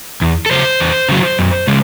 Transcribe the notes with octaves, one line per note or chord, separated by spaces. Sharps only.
E2
A4
C#3 F#3 C5
E2
C#3 F#3
F#2
C#3 G#3